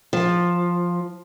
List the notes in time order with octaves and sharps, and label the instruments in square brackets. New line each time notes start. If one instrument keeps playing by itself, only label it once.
[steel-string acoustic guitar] F3